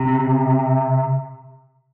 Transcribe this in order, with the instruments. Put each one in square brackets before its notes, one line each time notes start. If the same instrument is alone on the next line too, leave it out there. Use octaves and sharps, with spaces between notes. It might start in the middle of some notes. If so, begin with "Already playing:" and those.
Already playing: [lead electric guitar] C3